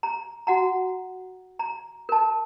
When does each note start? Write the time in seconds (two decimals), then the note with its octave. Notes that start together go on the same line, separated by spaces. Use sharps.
0.03 A#5
0.47 F#4 F#5 A#5
1.59 A#5
2.09 A#4 A5